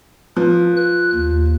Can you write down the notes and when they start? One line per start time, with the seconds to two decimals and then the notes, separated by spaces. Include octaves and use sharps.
0.37 F3 B4
0.77 F#6
1.14 D#2